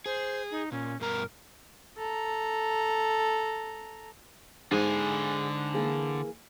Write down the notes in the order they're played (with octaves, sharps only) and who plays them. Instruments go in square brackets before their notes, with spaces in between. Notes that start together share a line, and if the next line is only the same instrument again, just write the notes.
[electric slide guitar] G#4 [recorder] C5
[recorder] D#4
[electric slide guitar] A#2 [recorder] C#4
[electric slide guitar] G2 B2 A#5 [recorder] A#4
[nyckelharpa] A4 A#5
[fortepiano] G#2 [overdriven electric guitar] D3 G#5 [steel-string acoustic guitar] G#4
[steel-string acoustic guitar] E3 A#3 G#4